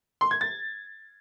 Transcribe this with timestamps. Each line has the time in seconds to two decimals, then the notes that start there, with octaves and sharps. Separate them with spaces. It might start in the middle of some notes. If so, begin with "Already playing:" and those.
0.21 C6
0.31 G#6
0.41 A6